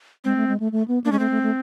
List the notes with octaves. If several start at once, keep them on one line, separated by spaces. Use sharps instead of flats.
G#3 C4
A3
G#3
A3
A3
B3
A#3 D4
G#3 C#4
A3 C4
A3
A3